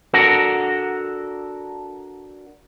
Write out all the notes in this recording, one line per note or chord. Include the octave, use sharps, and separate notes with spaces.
D4 F#4 A4 A#4 F#5